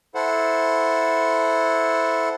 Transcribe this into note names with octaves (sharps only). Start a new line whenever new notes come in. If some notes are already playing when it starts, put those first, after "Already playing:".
E4 A4 C5 F#5